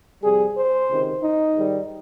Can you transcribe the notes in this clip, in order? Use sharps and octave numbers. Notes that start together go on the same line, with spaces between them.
F2 C3 G3 G#4
C5
C#2 C3 D#3
D#4
G#2 D#3 G3